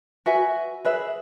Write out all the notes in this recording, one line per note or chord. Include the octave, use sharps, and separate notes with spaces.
F#4 B4 E5 G#5
G#4 B4 E5